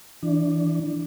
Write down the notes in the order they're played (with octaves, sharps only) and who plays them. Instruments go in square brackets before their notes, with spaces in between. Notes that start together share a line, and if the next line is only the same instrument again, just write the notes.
[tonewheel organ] E3 D4